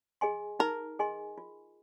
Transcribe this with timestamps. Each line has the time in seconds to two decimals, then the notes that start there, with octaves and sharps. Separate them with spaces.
0.21 G#4 D#5 G#5 C6
0.59 D#4 A#4
0.99 G#4 D#5 G#5 C6
1.38 F4